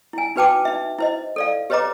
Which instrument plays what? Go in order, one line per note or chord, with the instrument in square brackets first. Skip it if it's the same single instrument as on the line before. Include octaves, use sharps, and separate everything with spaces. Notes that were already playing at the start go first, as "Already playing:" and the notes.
[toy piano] E4 G#5
D#4 F#4 B4 G5 A5 D6
D#4 E5
E4 C5 D#5
A4 D5 F5
G4 B4 C#5 D#5 A#5 D6